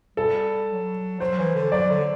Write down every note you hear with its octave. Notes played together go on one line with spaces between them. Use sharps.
G3 A4
F#3
F#3 C5
E3
D3
F#3 D5
D3